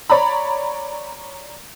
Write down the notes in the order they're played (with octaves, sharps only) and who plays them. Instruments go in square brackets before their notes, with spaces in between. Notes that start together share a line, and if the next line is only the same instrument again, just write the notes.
[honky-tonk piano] C#5 D5 A#5 B5